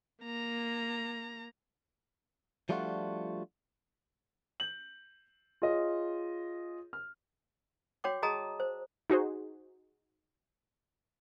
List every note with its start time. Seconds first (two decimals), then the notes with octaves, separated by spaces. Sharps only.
0.23 A#3 A#5
2.69 F3 G3 A3 D4 F4 F#4
4.60 G6 F#7
5.62 F4 G#4 C#5 D#5
6.93 F6
8.04 F#4 C#5 G5 D6
8.22 F#4 G#4 D#5 A5 A#5 D#6
8.60 C5
9.10 D#4 F#4 G#4 C5